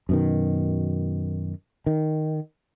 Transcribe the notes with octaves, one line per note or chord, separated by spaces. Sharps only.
F#2 B2 D#3
D#3